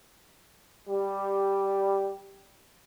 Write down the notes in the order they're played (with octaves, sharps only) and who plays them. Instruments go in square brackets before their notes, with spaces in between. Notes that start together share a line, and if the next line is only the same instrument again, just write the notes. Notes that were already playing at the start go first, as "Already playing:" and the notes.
[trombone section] G3 G4